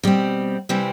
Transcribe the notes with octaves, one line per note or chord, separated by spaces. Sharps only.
B2 G3 C4
C3 E3 G3 C4